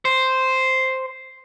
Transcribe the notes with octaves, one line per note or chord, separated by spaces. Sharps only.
C5